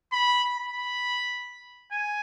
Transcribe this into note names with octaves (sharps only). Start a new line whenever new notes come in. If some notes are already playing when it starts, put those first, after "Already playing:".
B5
B5
G#5